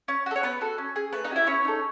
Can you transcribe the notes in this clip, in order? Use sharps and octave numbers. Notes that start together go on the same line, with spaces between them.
C#4
F#4 A4
C#5
B3 B4
F#4 A4
C#4
G#4
A3 B4
D#4 D#5
C#4 E4 F#4 E5
B3 C#4 C#5
D#4 A4